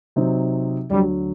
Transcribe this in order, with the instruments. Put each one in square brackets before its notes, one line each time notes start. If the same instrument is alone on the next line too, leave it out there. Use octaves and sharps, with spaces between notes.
[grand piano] C3 F#3 C4 D#4
[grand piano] D2 D3 F#3 [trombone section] G3